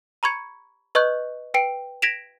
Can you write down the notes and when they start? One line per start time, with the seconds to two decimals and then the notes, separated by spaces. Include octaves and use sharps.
0.23 A#5 B5 C#6 G#6 C#7
0.95 B4 D#5 C#6 F#6 G6
1.54 B4 G5 C7 D7
2.02 G#6 A#6 B6 D7 E7 F7